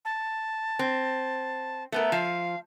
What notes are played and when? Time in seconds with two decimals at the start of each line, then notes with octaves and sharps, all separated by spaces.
0.05 A5
0.79 C4
1.92 A3 B3 A#4
2.12 F3 F5